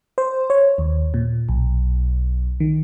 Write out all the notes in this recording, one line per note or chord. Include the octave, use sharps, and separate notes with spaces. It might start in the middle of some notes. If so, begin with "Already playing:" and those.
C5
C#5
D#2
A#2
B1
D#3